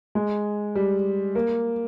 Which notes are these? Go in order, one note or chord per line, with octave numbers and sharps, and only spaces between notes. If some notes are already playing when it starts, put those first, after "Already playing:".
G#3
G3
A#3